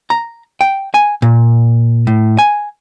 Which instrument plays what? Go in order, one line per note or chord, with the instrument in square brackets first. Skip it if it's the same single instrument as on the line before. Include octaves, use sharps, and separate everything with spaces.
[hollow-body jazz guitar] A#5
G5
G#5
A#2
A2
G#5